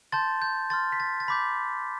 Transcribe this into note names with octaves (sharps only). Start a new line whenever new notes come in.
A5 C6 G6 A6
G6
C6 F6 A6
B6
A6
A6
B5 D6 G6 B6